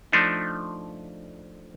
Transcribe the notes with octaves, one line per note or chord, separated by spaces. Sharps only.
F3 A3 D4 D#4